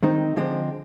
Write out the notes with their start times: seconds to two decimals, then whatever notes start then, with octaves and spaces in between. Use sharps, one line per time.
0.03 D#3 G#3 C4 D#4
0.36 D3 F3 G#3 C4